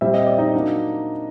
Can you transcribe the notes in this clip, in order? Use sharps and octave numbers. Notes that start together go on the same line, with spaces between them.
A#2 G3 C4 E5
D#5
D5
D#4 D#5
F#3 A#3 D4